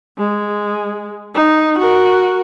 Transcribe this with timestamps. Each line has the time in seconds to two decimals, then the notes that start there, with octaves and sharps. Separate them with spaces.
0.18 G#3
1.35 D#4
1.78 F#4 A#4